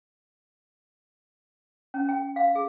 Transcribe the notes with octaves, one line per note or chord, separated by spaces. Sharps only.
C#4
G5
F5
G#4